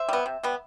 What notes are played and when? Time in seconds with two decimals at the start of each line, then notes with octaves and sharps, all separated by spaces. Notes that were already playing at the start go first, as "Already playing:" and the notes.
Already playing: C5 E5
0.09 G3 B3
0.26 C3
0.43 G3 B3